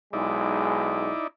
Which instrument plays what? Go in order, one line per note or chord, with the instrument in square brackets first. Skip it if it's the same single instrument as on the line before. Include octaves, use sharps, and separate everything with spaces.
[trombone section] B1 G#3 [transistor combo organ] D#4 E4 D5